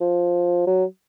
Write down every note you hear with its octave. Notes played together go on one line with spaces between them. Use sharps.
F3
F#3